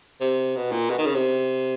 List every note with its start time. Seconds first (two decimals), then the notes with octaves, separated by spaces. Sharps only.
0.21 C3
0.56 B2
0.72 A#2
0.90 B2
0.98 D#3
1.06 C#3
1.15 C3